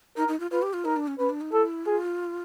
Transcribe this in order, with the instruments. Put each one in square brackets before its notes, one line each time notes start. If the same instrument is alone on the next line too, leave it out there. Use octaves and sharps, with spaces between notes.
[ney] D#4 [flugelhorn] A#4
[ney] D#4
F4
[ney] F4 [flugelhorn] B4
[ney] G4
F4
[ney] D#4 [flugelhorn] A#4
[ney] D4
C#4
[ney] C#4 [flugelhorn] B4
[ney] D4
D#4
[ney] E4 [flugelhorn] A4
[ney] F4 [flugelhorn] G#4